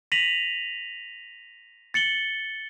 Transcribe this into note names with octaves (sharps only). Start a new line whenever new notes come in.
A#6 B6 D#7 F7 F#7
A6 C#7 F#7 G7